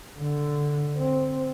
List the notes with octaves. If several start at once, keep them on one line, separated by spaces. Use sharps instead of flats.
D3
C4